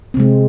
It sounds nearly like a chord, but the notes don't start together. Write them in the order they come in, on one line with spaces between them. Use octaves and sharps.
C4 C3 G#3